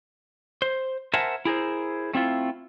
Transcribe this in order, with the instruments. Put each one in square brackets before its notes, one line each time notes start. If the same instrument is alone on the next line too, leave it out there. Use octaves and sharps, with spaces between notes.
[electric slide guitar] C5
A#4 C5 E5 F#5 G#5 A5
E4 G#4 A#4 C5
A3 C4 E4 F4